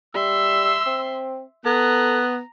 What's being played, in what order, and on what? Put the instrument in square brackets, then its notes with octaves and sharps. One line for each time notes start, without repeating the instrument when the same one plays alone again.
[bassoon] G3 [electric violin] E5 C6 [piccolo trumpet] E6
[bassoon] C4
[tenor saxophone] B3 [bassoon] A4 [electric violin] A#5 [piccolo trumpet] F#6